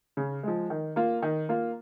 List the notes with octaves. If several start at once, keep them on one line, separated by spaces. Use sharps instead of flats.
C#3
F3 G#3
D#3
A#3 F4
D#3
A#3 F4